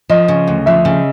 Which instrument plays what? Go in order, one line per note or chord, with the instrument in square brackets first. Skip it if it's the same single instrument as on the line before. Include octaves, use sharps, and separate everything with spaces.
[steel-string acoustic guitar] F3 [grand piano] D#5
[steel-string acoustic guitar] C#3
D2
[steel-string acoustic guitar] F3 [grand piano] E5
[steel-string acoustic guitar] C#3